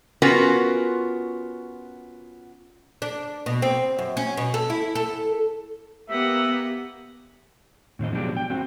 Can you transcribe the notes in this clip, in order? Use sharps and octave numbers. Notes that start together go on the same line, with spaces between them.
B3 C#4 F4 F#4 A#4
D4
B2
C4
F#2
C#4
B2
A4
E4
A4
A#3 B3 G4 E5 F#5
A2 D#3 C4 D#5
B2 F3 F#3 G#3 D4 G4
G5
A3 C4 F#4